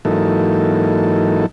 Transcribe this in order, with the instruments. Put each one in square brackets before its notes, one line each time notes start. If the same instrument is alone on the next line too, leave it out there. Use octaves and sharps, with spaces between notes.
[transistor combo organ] G#2 E3 F#3 A#3 D#4 A4